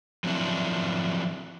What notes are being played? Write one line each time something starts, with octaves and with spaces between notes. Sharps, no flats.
F3 F#3 C4 D4 E4